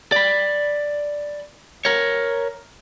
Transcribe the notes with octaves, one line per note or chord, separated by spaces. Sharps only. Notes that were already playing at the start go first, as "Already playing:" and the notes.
D5 B5
A#4 C#5